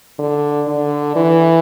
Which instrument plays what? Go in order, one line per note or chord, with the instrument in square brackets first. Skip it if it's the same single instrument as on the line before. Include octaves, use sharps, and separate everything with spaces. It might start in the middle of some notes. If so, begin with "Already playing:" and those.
[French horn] D3
D3
E3